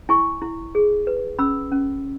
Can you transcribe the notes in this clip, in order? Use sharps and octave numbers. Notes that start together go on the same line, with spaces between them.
E4 G#5 C#6
E4
G#4
B4
C#4 B5 E6
C#4